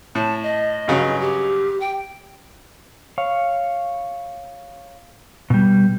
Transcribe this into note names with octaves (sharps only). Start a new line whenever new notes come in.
A2 A5
D#5
G2 C#3 F#3
G4
G5
C#5 F5
B2 G3